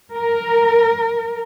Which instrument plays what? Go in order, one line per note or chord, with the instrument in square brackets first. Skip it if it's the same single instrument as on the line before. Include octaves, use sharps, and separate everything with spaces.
[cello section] A#4